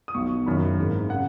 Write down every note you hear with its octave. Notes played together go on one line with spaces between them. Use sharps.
D#6
B1 B2 C#6
F#1 F#2 D#3 B5
G#1 G#2 D#3
C#3 F#5